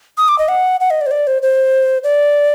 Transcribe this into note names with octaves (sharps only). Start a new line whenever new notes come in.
D#6
D6
D#5
F#5
F#5
D#5
D5
C5
D5
C5
C5
D5